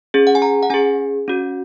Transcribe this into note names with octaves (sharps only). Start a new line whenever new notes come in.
C#4 G#4
F#5
G#5
A#5
F#5
C#4 G#4 G#5
C#4 F#4